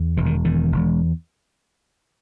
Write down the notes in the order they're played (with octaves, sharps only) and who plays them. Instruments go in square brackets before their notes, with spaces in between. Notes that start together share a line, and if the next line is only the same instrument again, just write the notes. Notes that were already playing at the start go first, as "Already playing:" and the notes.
Already playing: [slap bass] E2
E1 E3
D#3
E2 D#3
E1